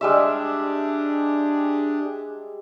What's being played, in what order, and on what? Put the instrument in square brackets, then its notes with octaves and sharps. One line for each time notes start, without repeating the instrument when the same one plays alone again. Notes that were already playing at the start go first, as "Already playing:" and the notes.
[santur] G3 G#3 E5 [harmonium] D4 G4 G#4